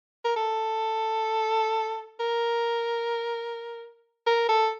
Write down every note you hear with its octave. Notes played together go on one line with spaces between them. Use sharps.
A#4
A4
A#4
A#4
A4